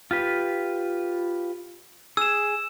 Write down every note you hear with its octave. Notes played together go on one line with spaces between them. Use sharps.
F4 G4 B4
G#4 E6 E7